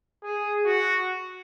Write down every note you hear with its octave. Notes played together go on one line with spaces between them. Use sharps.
G#4
F#4